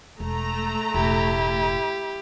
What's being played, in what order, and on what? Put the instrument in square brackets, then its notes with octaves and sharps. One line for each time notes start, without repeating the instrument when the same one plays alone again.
[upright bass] E1 [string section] A3 A#5
[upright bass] E1 A2 [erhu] E4 [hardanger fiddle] G4